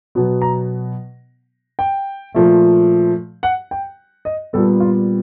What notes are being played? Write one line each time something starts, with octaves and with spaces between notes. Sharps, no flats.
B2 F#3 B3
A#5
G5
A#2 F3 A3
F#5
G5
D#5
A#2 G3 B3 A4
F4